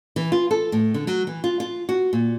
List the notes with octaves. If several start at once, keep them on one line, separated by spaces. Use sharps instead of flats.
E3
F4
A4
A2
D3
F#3
E3
F4
F4
F#4
A#2